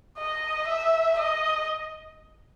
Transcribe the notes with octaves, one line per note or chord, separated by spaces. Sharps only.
D#5
E5
D#5